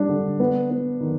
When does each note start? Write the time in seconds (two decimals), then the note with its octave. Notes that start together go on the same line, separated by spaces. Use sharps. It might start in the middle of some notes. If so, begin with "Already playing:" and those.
Already playing: G3 D4
0.09 D3
0.40 B3
0.70 B3
1.01 D#3